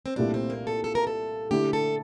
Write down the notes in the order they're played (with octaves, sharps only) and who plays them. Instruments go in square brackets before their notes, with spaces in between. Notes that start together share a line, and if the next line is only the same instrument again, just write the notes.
[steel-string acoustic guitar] C4
[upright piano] C2 A#2 A3 E4 G4 [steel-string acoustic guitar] D4
[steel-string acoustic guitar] C4
A#3
A4
A4
A#4
A4
[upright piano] D3 A3 E4 [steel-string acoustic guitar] G4
[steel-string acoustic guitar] A4